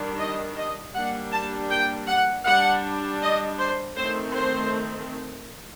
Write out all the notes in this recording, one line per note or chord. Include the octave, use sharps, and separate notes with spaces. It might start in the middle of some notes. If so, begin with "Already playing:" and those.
Already playing: D#3 G3 D4
D#5
D#5
G3 A#3 D4 F#5
A5
G5
F#5
G3 D4 F#5
D#5
C5
D#3 A3 C4 C5
C5